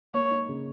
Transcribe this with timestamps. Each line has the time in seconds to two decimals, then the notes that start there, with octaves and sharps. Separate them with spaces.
0.14 A#3 C#5
0.31 D#4
0.49 C#3